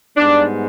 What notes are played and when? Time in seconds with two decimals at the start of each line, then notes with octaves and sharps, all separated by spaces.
0.16 G#2 G3 B3 D4